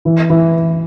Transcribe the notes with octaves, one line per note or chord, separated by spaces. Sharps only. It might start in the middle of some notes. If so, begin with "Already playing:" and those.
E3
E3